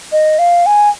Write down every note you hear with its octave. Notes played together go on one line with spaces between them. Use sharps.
D#5
F5
G#5